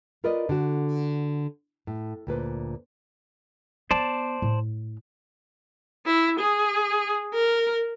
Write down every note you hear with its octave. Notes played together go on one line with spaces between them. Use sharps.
F4 A#4 B4 D5 D#5
D3 F#4
A2
D2 A#2 B4 C5
B3 C5 D5 A5
A2
E4
G#4
A#4